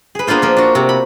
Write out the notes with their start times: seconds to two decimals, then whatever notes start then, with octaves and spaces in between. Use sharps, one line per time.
0.15 G#4 B4
0.27 A#3 B3 D4 F4 C5
0.42 F3 A#3
0.57 D4 F#4
0.75 C3
0.89 B5